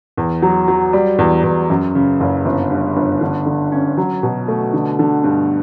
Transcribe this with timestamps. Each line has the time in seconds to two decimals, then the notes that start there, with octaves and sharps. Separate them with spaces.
0.17 E2
0.42 F#3
0.68 F#3
0.93 G3
1.19 E2
1.44 E2
1.70 F#2
1.95 C#3
2.20 F#1
2.45 G1
2.71 G2
2.96 G1
3.21 D3
3.46 D3
3.72 C#4
3.97 F#3
4.23 B2
4.48 A3
4.74 D3
4.99 D3
5.24 G2